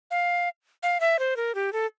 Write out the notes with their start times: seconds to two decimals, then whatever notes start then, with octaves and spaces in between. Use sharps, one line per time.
0.11 F5
0.83 F5
1.00 E5
1.19 C5
1.37 A#4
1.55 G4
1.73 A4